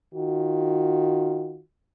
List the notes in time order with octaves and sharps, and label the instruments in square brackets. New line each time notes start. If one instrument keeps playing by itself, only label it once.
[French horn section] D#3 F4 F#4